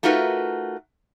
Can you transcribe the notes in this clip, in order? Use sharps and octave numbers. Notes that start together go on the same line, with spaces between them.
A3 D#4 F4 F#4 A#4 B4